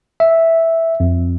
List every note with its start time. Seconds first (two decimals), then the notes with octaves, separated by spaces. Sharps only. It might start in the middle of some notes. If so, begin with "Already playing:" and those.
0.20 E5
1.00 F2